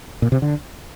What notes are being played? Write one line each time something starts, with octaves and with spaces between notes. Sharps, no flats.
A#2
C3
D3